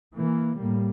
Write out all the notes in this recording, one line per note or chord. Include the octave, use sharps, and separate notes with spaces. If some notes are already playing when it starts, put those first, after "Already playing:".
E3 A#3
A2 G3 A#3